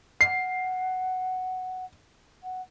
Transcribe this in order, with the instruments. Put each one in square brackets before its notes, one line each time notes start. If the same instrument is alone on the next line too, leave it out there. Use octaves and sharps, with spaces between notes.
[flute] F#5 [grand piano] C7
[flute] F#5